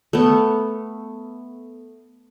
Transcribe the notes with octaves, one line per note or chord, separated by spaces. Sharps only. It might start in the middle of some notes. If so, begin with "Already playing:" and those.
A3 B3